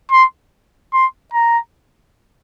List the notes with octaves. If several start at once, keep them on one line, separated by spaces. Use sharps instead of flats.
C6
C6
A#5